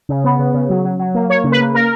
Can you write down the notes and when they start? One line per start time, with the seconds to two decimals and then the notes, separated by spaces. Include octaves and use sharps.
0.09 C#3
0.24 B3
0.39 C#3
0.54 C#3
0.69 F#3
0.84 F#3
0.99 F#3
1.15 A#3
1.30 A#3 C#5
1.44 C#3
1.52 B4
1.60 A#3
1.74 A#3 A#4